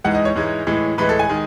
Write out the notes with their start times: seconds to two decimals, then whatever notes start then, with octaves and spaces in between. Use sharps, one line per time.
0.04 G#2 E3 G#3 F#5
0.14 D#5
0.25 C#5
0.35 G#2 E3 G#3
0.67 A2 E3 G#3
0.98 A2 E3 G#3 B4
1.09 A4
1.19 G#5
1.29 D#3 G#3